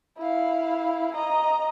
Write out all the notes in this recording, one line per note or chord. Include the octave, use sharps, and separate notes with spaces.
E4 F5
D#5 A#5